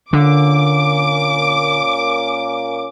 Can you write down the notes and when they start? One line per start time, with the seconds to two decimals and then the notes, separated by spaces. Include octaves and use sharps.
0.13 A#2 D3 A#3 C#4 D6